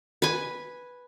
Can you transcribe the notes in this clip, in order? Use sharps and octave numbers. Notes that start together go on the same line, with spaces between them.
B4 G#5